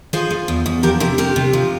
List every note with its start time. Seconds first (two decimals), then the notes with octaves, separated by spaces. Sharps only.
0.13 F3 G#4 C5
0.31 F3
0.48 E2
0.66 E2
0.83 F3 G4 A#4
1.00 C3 G4 A#4
1.18 C3 G4 A#4
1.36 C3
1.53 F3